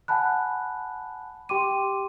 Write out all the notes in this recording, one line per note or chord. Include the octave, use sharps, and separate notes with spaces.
F#5 G#5 A5 B5 F#6
G4 G5 C6 D6 D#7